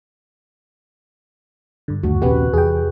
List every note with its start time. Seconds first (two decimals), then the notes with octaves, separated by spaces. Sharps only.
1.88 G2 D3
2.03 D#2 A3 F#4
2.22 A#1 D#2 C3 B3 C#4 F#4 G4 B4
2.54 E2 G#4 G5